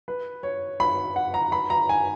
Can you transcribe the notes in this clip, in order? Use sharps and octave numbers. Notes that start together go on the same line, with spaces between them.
B4
C#5
B5
F#5
A#5
B5
A#5
G#5